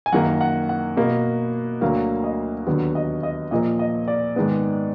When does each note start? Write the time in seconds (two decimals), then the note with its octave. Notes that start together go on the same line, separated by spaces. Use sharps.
0.06 G#5
0.12 F#2 D#3 A#3 F#5
0.41 F#5
0.69 F#5
0.97 B2 A#3
1.81 D2 D3 F#3 A#3 F5
2.24 D#5
2.67 D#2 D3 F#3 B3
2.95 D#5
3.23 D#5
3.51 A#2 F3 A#3 D#5
3.79 D#5
4.08 D5
4.36 G#2 D#3 G#3 B3